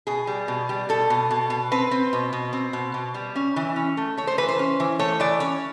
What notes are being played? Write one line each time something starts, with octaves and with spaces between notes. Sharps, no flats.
B2 G#4
G3
B2
G3
B2 A4
B2
B2
B2
C4 B4
C4
B2
B2
C4
B2
B2
G3
C#4
E3
C#4
A3
A3 C#5
C5
E3 B4
C5
C#4
E3
A3 C#5
E3 D5
C#4 C#5